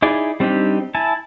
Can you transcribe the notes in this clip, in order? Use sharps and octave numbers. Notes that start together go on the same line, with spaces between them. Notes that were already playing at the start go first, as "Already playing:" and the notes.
D#4 E4 G#4 D5
G3 C4 D4 D#4 G4
E4 G#5 A5